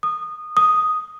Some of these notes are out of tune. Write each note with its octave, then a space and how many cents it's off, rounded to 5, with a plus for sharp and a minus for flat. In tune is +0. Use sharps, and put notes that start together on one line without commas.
D#6 -20
D#6 +0